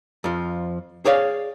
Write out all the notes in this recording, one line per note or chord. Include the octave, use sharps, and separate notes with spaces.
F2 F3
G#4 C#5 D5 F5